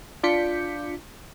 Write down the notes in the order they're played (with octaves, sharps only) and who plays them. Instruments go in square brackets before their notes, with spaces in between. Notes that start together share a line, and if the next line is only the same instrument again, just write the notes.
[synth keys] D4 F4 D6 G6 B6 C#7